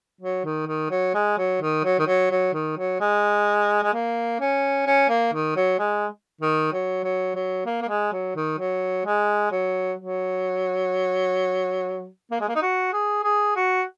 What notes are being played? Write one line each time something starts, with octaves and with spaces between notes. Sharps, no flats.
F#3
D#3
D#3
F#3
G#3
F#3
D#3
F#3
D#3
F#3
F#3
D#3
F#3
G#3
G#3
A#3
C#4
C#4
A#3
D#3
F#3
G#3
D#3
F#3
F#3
F#3
A#3
A#3
G#3
F#3
D#3
F#3
G#3
F#3
F#3
A#3
G#3
A#3
D#4
F#4
G#4
G#4
F#4